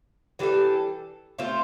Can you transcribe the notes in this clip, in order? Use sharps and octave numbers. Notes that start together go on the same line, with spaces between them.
E3 G3 D4 A4
A3 C4 F4 C5